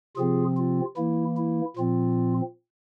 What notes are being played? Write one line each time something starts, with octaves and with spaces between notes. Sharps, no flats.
C3 F3 C4 F4 G#4
F4
E3 A#3 E4
E4
A#2 F3 C4 F4